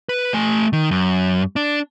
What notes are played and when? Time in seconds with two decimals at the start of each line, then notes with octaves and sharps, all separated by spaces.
0.09 B4
0.34 A3 G#5
0.73 D#3
0.91 F#2
1.56 D4